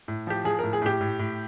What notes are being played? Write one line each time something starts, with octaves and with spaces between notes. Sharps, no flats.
A2
F3 G4
F3 G#4
A2 A#4
G#4
A2 G4
A2
A2